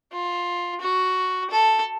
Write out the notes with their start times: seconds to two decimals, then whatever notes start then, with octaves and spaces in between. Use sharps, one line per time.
0.12 F4
0.81 F#4
1.50 A4